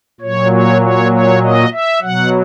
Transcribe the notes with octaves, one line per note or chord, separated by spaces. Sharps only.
A#2 F#3 C#5
C#5
C#5
C#5
D#5
E5
B2 F#3 F#5